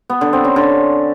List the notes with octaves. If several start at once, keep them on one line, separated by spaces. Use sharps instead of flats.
B3
D3
C4
C#4
D3